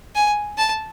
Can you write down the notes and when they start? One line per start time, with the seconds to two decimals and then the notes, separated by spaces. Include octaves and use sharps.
0.16 G#5
0.58 A5